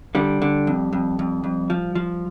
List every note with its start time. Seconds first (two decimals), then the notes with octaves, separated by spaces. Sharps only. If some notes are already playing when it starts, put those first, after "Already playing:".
0.15 D3 G3
0.42 D3
0.67 F2
0.93 F2
1.19 F2
1.44 F2
1.70 F3
1.95 F3